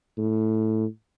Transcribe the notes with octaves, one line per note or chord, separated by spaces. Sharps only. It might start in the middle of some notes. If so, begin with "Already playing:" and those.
A2